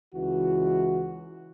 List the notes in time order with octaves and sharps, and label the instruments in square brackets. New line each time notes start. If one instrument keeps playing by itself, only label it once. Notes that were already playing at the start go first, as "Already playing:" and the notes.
[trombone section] C#2 E3 F#4